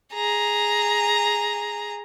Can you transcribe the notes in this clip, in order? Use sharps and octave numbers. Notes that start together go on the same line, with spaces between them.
G#4 A#5